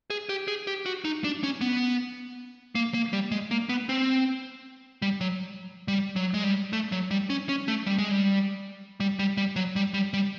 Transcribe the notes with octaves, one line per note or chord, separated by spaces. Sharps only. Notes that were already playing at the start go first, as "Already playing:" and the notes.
G#4
G4
G#4
G4
F#4
D#4
D4
C#4
B3
A#3
A#3
G3
G#3
A#3
B3
C4
G3
F#3
G3
F#3
G#3
G3
A3
F#3
G3
C#4
C#4
A3
G3
G#3
G3
G3
G3
G3
F#3
G3
G3
G3